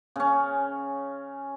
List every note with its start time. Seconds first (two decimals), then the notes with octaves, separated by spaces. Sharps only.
0.16 C#3 C#4